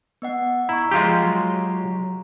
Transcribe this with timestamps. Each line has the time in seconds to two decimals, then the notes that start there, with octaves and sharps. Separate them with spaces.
0.22 B3 D#5 F#5
0.69 E4 A#5 C#6
0.91 F3 G#3 F4 G4
1.20 F#3